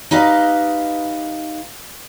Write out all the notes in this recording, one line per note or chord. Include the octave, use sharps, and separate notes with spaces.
D#4 G4 B4 D#5 F5